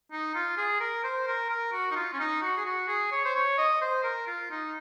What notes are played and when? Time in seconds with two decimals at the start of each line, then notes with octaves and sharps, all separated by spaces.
0.12 D#4
0.35 F4
0.57 G#4
0.80 A#4
1.04 C5
1.27 A#4
1.49 A#4
1.72 F#4
1.91 D#4
1.95 F4
2.14 C#4
2.19 D#4
2.42 F#4
2.57 G#4
2.65 F#4
2.88 G#4
3.11 C#5
3.25 C5
3.35 C#5
3.58 D#5
3.81 C5
4.03 A#4
4.27 F4
4.51 D#4